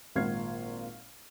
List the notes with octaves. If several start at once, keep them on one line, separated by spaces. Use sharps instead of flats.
G#1 A#2 F6 G#6 C7